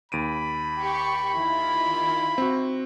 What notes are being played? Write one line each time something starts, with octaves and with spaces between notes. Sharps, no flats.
D#2 B5 D7 D#7
G4 C#6
D#3 E4 F4
C4 F#4